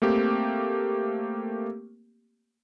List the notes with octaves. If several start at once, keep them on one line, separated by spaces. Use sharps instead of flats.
A3 A#3 C4 G4